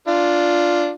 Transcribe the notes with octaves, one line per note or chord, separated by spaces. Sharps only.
D4 F4